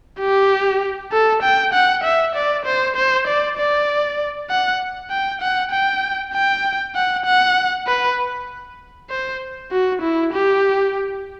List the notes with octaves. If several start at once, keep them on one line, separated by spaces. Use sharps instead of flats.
G4
A4
G5
F#5
E5
D5
C5
C5
D5
D5
F#5
G5
F#5
G5
G5
F#5
F#5
B4
C5
F#4
E4
G4